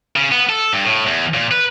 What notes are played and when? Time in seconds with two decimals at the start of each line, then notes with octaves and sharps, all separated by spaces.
0.16 C#3
0.32 B3
0.49 A4
0.73 G2
0.85 A2
1.07 E2
1.34 A#2
1.51 B4